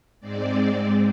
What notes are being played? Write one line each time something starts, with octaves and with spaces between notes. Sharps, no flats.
G#2 G#3 C4 D5